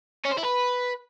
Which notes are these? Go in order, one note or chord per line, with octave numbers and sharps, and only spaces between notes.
C#4
C5
E4
B4